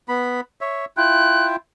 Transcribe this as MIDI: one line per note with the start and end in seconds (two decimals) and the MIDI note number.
0.08 0.41 59
0.08 0.41 83
0.61 0.85 73
0.61 0.85 76
0.97 1.56 64
0.97 1.56 65
0.97 1.56 79
0.97 1.46 90